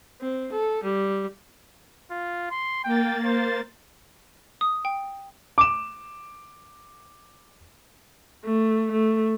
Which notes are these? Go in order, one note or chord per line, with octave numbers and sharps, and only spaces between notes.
C4
A4
G3
F4
C6
A#3 G5 A6
C5
D#6
G5
D6 E7
A3
A3